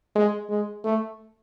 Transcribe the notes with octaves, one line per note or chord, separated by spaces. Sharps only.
G#3
G#3
A3